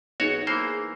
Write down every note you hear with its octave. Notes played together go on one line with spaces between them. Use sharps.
B1 B3 D#4 F#4 G#4 C#5
E3 A#3 C5